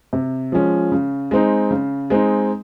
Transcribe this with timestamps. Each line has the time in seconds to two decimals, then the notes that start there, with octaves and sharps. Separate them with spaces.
0.13 C3
0.52 F3 G#3 C#4
0.92 C#3
1.31 G#3 C4 D#4
1.71 C#3
2.10 G#3 C4 D#4